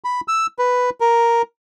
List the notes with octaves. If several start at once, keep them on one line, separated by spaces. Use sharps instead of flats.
B5
E6
B4
A#4